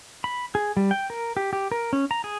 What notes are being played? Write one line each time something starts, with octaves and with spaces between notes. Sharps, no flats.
B5
G#4
G3
G5
A#4
G4
G4
A#4
C#4
A#5
G#4